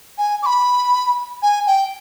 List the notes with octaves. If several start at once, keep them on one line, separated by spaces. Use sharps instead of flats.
G#5
D6
B5
G#5
G5